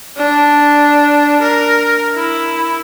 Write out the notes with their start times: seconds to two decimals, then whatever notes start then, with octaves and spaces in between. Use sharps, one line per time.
0.17 D4
1.42 A#4
2.16 E4